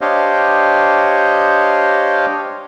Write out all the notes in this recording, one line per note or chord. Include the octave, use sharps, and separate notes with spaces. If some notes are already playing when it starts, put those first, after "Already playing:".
D4 G4 C5 C#5 D#5 F5